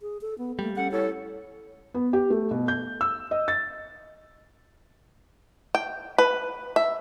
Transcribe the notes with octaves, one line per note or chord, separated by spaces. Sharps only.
G#4
A4
B3
G3 A3 A#3
C#4 A4 F#5
E4 A4 C#5
B3
G4
A3
B2
G6
E6
D#5
A6
G5
B4
E5